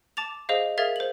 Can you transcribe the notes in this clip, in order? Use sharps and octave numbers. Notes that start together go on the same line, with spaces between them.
A5 D6 A6 F7
G#4 C5 D#5 F5
G#4 A#4 E5 F5 G#6 A6
C5 F#7